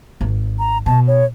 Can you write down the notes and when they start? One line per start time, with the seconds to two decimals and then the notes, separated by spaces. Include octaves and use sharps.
0.21 G#1
0.59 A#5
0.86 B2 A5
1.07 C#5